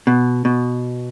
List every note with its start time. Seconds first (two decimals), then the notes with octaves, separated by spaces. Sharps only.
0.07 B2
0.45 B2